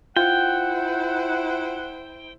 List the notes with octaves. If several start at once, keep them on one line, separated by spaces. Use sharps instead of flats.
E4 F4 C5 F#5 G5